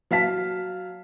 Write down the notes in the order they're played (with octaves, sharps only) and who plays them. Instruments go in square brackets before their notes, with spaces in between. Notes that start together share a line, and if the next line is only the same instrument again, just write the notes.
[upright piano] F#3 F5 A5 B6